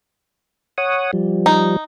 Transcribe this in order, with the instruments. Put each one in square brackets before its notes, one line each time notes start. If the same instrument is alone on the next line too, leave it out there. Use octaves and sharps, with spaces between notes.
[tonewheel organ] C#5 F#5 D#6
F3 G3
[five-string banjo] D#4